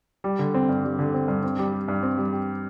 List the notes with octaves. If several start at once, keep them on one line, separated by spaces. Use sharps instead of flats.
G3
D3
C4
G2
G3
D3
C4
G2
C4
G3
G4
G2
C4
G3
G4